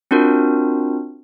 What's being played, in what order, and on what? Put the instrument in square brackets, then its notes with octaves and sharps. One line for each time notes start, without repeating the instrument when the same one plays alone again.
[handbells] C4 D4 F4 F#4 A#4